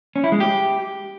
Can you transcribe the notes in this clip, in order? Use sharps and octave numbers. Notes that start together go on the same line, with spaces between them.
C#4
E4
G#3
G4